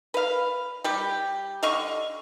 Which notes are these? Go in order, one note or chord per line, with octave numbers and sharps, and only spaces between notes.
B4 F5
G3 G4
D3 D#5 F5 C#6